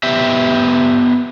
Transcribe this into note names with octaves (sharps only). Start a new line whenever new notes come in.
B3 G4 E5